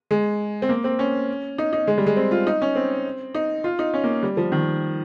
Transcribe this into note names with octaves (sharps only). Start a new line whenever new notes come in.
G#3
C4
A#3
C4
C#4
D#4
D#4
G#3
G3
G#3
C4
F4
D#4
C#4
C4
D#4
F4
D#4
C#4
A#3
G3
F3
D#3